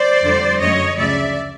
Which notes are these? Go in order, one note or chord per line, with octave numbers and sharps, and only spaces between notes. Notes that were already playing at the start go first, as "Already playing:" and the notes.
Already playing: C5 D5
F2 D3 G3
F#2 D3 F#3 A3 C#5 D#5
D2 C#3 F3 D5 E5